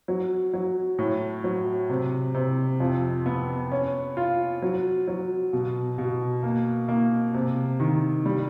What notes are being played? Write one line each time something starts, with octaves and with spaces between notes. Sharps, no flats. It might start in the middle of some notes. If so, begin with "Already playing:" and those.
F#3
F#3
A2
F#3
C3
C3
F2
B3
C#4
F4
F#3
F#3
B2
B2
A#3
A#3
C3
D#3
G3